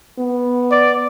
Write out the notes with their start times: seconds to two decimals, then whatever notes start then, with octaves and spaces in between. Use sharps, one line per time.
0.18 B3
0.71 D5